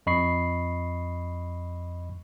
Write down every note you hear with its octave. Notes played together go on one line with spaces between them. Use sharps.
F2 D#5 B5 C#6 C7